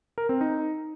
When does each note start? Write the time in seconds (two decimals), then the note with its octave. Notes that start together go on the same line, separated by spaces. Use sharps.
0.18 A#4
0.29 C4
0.41 D#4